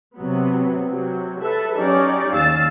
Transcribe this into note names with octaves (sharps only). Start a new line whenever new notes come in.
C3 F#3 B3
C3 F#3
A4 B4 E5
F#3 C#4 D#4 G4 D5
D#2 F5 E6 A6